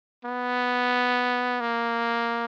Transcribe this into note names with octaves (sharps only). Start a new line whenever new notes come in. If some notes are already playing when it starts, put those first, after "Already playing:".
B3
A#3